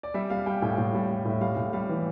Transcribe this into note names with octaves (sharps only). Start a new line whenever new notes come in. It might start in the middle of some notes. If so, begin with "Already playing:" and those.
D5
G3 E5
G3 F5
G3 G5
A2 G5
A2
G3
G3
A2 E5
G3 F5
A2
G3 F5
E3